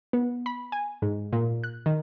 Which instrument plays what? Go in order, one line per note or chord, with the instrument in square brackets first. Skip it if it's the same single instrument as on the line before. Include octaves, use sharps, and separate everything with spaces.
[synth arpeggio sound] B3
B5
G#5
G#2
A#2
F#6
D#3